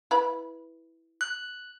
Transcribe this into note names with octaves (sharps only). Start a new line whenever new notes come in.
E4 B4 B5
F#6